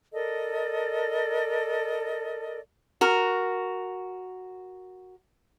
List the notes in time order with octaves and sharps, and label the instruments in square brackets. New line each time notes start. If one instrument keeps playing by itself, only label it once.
[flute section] A4 A#4 D5 D#5
[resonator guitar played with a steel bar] F#4 A#4